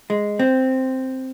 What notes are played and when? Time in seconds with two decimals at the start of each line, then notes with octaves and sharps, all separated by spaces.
0.10 G#3
0.39 C4